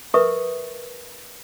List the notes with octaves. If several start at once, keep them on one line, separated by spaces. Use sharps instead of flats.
A#4 B4 E5 C#6 D#6